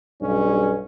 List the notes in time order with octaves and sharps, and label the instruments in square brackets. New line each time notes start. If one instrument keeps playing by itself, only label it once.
[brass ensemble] B1 G2 [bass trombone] C#4